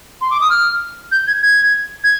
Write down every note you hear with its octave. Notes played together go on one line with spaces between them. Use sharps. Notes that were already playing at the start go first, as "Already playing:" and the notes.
C6
D6
D#6
F6
G6
G#6
G#6
G#6